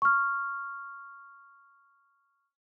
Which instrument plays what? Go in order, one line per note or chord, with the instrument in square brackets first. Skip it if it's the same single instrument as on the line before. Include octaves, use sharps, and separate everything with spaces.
[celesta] C#6 F6